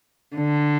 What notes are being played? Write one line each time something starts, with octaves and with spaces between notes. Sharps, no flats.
D3